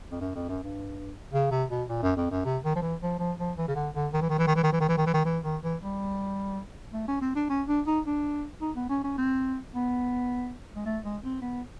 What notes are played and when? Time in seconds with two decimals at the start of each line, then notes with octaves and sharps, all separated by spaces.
0.11 F2
0.21 F#2
0.35 F2
0.49 F#2
0.63 G2
1.33 C#3
1.51 C3
1.70 B2
1.89 A#2
2.02 F#2
2.16 F2
2.31 F#2
2.45 C3
2.64 D#3
2.75 F3
2.82 E3
3.02 F3
3.19 F3
3.39 F3
3.58 E3
3.68 C#3
3.76 D3
3.95 D3
4.13 D#3
4.21 E3
4.29 D#3
4.38 E3
4.47 D#3
4.55 E3
4.63 D#3
4.72 E3
4.80 D#3
4.88 E3
4.97 D#3
5.06 E3
5.14 D#3
5.25 E3
5.44 D#3
5.63 E3
5.81 G3
6.93 A3
7.08 C#4
7.21 C4
7.35 D4
7.49 C#4
7.68 D4
7.87 D#4
8.06 D4
8.61 D#4
8.76 B3
8.89 C#4
9.04 C#4
9.18 C4
9.74 B3
10.76 G#3
10.86 A3
11.04 G#3
11.24 C4
11.42 B3